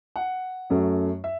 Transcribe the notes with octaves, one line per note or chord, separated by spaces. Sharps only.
F#5
F#2 F#3 A3
E5